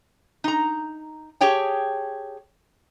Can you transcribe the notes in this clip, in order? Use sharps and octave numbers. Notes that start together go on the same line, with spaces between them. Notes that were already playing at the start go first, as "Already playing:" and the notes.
D#4 A#5
G4 G#4 C#5 G5 A5